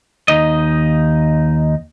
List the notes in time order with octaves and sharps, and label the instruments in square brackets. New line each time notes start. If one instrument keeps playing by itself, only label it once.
[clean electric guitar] D#2 D#4 D#5